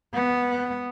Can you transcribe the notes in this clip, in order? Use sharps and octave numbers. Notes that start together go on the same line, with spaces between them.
B3